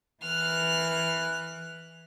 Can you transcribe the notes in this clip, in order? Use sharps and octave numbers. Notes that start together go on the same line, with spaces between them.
E3 F6 F#6